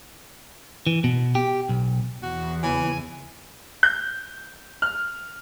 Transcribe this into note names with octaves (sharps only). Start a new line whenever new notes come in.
E3
B2
G4
B1
E2 F#4
C#3 E3 G#5 B5
G6
F6